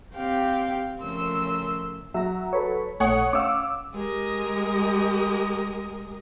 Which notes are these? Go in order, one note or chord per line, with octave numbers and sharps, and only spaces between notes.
C4 G4 F5 G5
C#3 F3 A3 A#4 C6 E6
F#3 E5 A#5
A4 B4 C#5
A#1 A3 C#5 F#5 D#6
C#4 C#5 F5 D6 E6
G#3 G4 A#4 D#6